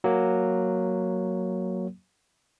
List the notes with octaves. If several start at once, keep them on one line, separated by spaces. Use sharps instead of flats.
F#3 A#3